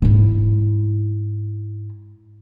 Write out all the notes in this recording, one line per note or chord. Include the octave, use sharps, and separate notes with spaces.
G#2 E4